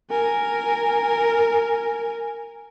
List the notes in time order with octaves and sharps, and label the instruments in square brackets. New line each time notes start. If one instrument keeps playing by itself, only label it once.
[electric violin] A#4 G#5